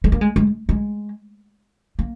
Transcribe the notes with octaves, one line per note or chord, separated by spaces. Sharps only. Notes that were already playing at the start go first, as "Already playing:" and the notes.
G#3
A#3
G#3
G#3
G#3
A#3